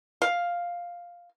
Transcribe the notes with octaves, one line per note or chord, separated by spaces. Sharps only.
F5